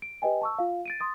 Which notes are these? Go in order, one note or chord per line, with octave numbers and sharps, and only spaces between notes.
D7
G4 B4 D#5 G5 G#5
A5 C#6 E6
F4 F5
A6 D7 D#7
C6 D#6 A6